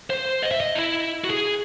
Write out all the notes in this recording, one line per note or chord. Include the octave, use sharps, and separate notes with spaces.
C5
D#5
E5
D#5
E4
F#4
G#4